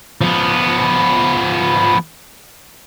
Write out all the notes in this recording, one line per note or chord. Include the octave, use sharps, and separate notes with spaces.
F3 B3